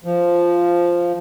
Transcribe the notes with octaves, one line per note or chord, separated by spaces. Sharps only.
F3